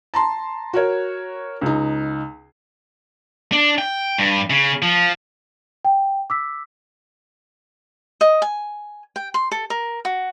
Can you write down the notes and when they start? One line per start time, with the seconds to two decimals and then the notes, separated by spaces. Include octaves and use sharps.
0.14 A5 A#5 C6
0.73 F#4 A#4 C#5
1.61 C#2 D#4
3.52 D4
3.78 G5
4.18 G2
4.50 C#3
4.82 F3
5.85 G5
6.30 D6 E6 B6
8.21 D#5
8.42 G#5
9.16 G5
9.34 C6
9.52 A4
9.70 A#4
10.05 F#4